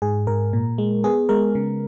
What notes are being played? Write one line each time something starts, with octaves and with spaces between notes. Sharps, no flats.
G#2 G#4
G#2 A#4
A#2
G#3
B3 G#4
G#3 A#4
C#3